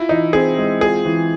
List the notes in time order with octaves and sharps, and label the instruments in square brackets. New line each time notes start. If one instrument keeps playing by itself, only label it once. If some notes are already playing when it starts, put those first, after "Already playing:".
Already playing: [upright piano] E4 [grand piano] F4
[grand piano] E3 [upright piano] D#4
[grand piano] C4 [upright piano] G#4
[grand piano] G#3
[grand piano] F4 [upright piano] G#4
[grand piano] E3